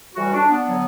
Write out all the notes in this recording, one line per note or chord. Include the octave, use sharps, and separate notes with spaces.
A2 E3 G3 F#4
D4
B3
D3 F#3